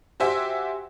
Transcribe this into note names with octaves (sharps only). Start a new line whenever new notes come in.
F#4 G4 C5 E5 G5 G#5